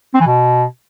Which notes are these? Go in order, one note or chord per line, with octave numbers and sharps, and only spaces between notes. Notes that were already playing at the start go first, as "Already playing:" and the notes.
C4
E3
B2